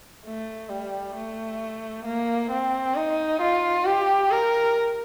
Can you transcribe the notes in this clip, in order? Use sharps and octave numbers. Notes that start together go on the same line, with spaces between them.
A3
G3
A3
A#3
C4
D#4
F4
G4
A#4